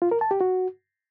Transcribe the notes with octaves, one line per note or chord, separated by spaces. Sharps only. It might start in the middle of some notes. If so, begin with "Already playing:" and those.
F4
A#4
A5
G4
F#4